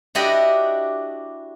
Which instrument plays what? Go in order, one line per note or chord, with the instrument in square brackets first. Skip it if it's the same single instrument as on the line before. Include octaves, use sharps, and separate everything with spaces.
[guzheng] D4 E4 F#4 G4 D5 D#5